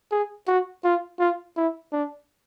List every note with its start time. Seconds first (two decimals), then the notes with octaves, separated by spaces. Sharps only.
0.11 G#4
0.48 F#4
0.84 F4
1.19 F4
1.57 E4
1.92 D4